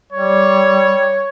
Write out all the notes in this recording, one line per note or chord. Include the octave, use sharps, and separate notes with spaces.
G3 C#5